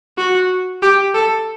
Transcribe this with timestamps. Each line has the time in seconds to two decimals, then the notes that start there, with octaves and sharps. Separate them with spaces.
0.18 F#4
0.82 G4
1.14 A4